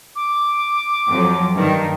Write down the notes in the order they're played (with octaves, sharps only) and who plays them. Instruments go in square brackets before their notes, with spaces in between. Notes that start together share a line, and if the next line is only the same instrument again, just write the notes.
[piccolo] D6
[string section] F2 F#3
G2 D#3